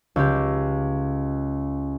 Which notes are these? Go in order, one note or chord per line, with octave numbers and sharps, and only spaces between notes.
C#2 G4